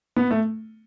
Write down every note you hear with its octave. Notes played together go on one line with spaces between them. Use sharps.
B3
A3